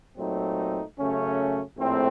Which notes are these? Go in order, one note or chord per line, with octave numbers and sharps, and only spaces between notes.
A#2 F#3 A3 C4 D#4
F#2 C#3 A3 C#4
A#1 A2 A3 C4